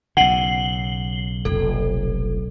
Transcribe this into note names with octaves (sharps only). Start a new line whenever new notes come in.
B1 C#3 F#5 C7 F#7 G7
F1 A#2 A4